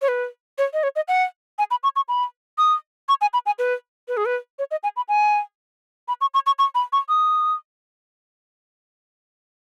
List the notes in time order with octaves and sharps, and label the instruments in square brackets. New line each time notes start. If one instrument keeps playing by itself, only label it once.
[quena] C#5
B4
C#5
D#5
C#5
D#5
F#5
G#5
B5
C#6
C#6
B5
D#6
C#6
G#5
B5
G#5
B4
B4
G#4
B4
C#5
D#5
G#5
B5
G#5
B5
C#6
C#6
C#6
C#6
B5
C#6
D#6